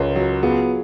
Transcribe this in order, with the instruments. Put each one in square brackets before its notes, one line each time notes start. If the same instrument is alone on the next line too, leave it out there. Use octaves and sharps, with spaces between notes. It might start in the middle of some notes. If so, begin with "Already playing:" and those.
Already playing: [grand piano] C#2 [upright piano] G#4 A#4 B4 C#5
[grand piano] F#3
[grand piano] B3 [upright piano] F4 G#4